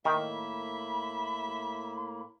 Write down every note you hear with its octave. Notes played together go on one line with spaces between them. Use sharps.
A2 D#3 A#3 E5 B5